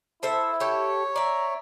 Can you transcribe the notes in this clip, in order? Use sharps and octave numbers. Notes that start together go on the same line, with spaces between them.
E4 A4 C5 E5
G4 A4 C#5
D5 E5 A#5